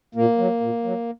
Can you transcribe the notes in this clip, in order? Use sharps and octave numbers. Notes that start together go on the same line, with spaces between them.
A#2 A#3
F#3
A#2
F#3